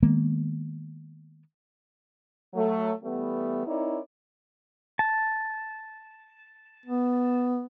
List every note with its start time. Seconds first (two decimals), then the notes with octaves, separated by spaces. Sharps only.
0.03 D#3 G#3 A#3 B3
2.54 F#3 A3
3.03 E3 G3 A3 B3
3.66 C4 D#4 E4 A#4 C#5 D5
4.99 A5
6.86 B3